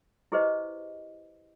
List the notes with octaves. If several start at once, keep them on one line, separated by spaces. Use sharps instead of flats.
E4 G4 G#4 B4 C5 D#5